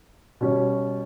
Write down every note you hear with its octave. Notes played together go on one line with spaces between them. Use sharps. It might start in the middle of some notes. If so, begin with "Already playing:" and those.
B2 G3 C#4